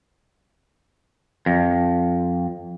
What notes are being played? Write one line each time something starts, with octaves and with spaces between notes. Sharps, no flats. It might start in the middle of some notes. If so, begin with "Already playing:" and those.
F2